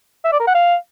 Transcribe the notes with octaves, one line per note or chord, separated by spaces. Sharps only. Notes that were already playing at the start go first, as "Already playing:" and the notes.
E5
D5
A#4
F#5
F5